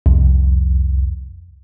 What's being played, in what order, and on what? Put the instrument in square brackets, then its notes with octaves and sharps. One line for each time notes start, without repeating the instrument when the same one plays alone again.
[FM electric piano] C2 F2